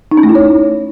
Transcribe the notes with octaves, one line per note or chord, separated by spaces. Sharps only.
D#4
C#4
A3
E4
C#5